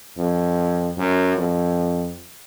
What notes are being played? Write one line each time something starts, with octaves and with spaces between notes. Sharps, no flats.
F2
F#2
F2